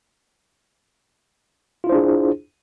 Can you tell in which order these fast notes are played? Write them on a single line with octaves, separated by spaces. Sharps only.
F4 E4 C5 D4 G#4